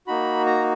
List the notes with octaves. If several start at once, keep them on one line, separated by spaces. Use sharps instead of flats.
A#3 D#4 F#4 B5
A#5